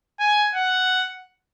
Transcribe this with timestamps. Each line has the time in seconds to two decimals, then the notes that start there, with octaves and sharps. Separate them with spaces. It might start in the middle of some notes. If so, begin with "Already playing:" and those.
0.20 G#5
0.55 F#5